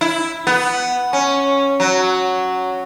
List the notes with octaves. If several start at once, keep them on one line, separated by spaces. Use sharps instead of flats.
E4
B3
C#4
F#3